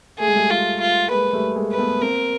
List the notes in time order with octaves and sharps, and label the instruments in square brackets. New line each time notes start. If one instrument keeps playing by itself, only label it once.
[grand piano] A3 [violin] G#4
[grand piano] G#3
G3 A3
[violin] F4
F4
[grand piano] G#3 A#3 [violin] B4
[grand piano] G3 A3
G#3 A#3
[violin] B4
[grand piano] A3 B3
[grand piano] A#3 C4 [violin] A#4